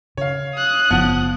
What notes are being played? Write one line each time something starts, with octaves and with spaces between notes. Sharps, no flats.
C#3 C#5 F5
D#6 F#6
F#1 F3 B3 F#5